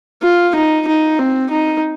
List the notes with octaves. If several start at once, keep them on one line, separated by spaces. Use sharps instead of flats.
F4
D#4
D#4
C4
D#4